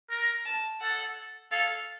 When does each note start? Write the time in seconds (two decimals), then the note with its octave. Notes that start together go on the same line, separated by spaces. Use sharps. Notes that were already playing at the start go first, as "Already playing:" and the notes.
0.11 A#4
0.46 A5
0.81 A4 F#5
1.51 A4 F5